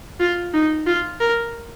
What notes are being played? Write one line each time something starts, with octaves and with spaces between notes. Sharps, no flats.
F4
D#4
F4
A#4